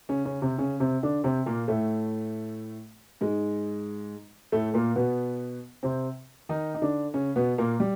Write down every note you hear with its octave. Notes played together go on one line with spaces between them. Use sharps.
C#3 C#4
C#3 C#4
C3 C4
C#3 C#4
C3 C4
D3 D4
C3 C4
A#2 A#3
A2 A3
G#2 G#3
A2 A3
A#2 A#3
B2 B3
C3 C4
D#3 D#4
D#4
D3 D4
C#3 C#4
B2 B3
A#2 A#3
G3